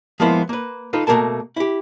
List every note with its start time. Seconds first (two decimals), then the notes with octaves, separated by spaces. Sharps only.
0.20 F3 G#3 A#3 B3 E4 C5
0.49 A#3 B4
0.93 D#4 F4 A4 B4
1.07 B2 A3 A#3 G#4 A#4 A5
1.56 E4 G4